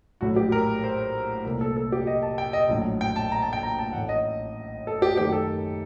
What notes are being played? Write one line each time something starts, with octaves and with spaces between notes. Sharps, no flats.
A#1 A2 F#3 F#4
G4
A#4
C5
C2 A#2 A3 A#4
A4
A4
G4
D#5
A5
G5
D#5
A#1 A2 F#3
G5
A5
A#5
A5
G5
A#5
A5
A1 A2 A3 F#5
D#5
A4
G4
F#2 D#3 A3 G4
A4